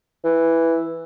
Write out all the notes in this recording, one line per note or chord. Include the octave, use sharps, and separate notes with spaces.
E3